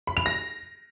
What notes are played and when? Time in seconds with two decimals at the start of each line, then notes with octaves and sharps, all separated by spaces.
0.07 B5
0.17 F7
0.26 A#6